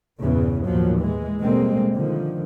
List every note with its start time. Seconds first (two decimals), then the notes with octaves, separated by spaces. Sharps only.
0.24 E2 G2 A#2 C#3 E3
0.67 D#2 A2 F3 F#3
1.00 E3 G#3
1.44 B2 D3 G3 G#3 A#3 C4
1.94 D3 D#3 F3